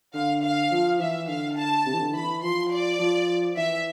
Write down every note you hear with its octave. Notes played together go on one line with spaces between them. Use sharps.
D3 F5
F5
F3
E3 E5
D3 F5
A5
C3
E3
D3
E3 B5
F3 C6
D5
F3
E3 E5